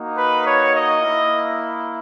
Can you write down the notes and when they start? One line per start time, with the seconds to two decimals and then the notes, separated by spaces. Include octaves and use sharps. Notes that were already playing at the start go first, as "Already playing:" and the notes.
Already playing: A#3 D#4 F#4
0.17 B4
0.46 C#5
0.75 D#5
1.03 A#3 E4